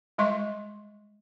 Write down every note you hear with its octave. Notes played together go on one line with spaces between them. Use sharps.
G3 G#3 D#5 C6 C#6